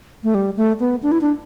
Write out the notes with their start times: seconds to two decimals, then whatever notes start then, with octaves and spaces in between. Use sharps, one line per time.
0.23 A3
0.35 G3
0.57 A3
0.80 B3
1.03 D4
1.12 E4
1.21 D4